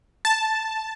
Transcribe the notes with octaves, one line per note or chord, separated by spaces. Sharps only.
A5